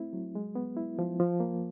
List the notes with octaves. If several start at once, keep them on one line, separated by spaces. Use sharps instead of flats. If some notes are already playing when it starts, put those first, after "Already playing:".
Already playing: A3 C4 E4
F#3
G#3
B3
E4
F3
F3
A#3